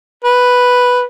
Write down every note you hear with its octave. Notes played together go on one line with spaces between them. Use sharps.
B4